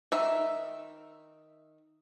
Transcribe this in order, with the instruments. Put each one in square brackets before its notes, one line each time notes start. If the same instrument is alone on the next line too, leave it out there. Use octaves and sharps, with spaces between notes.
[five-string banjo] D#3 E5